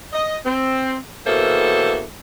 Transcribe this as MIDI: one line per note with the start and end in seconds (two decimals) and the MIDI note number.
0.13 0.37 75
0.46 0.95 60
1.27 2.03 40
1.27 2.03 47
1.27 2.03 58
1.27 2.03 69
1.27 2.03 72
1.27 2.03 76